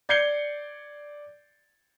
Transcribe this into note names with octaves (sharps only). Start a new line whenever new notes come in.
D5 G6 G#6 C7 C#7 G7